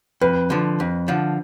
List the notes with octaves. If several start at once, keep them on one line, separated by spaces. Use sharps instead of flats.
F2 B4
D3 F3
F2
D3 F3